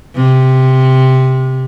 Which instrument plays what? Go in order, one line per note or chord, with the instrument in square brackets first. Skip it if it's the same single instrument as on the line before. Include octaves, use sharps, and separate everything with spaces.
[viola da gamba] C3